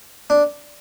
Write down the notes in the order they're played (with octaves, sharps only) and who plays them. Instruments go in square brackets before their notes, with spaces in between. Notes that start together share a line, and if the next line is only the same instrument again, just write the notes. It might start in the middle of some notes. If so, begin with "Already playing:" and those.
[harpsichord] D4